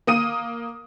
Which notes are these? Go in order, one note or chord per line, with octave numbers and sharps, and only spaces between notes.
A#3 D#6 D#7